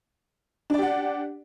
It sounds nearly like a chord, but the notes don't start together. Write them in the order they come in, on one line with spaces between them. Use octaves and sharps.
D4 D5 G4 F#5